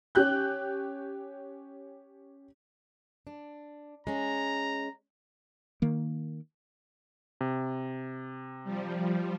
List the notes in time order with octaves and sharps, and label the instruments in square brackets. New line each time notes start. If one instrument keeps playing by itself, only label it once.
[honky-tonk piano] C#4 G4 F#6 G6
[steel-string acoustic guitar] D4
[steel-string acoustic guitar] G#3 C#4 [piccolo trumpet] A#5
[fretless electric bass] D#3 A#3
[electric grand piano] C3
[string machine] F3 G3